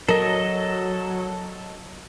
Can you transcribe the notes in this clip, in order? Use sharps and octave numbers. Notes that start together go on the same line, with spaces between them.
F#3 A4 A#4 D#5